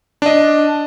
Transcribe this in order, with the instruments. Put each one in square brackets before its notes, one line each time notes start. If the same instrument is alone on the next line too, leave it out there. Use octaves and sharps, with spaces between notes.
[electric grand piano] D4 D#5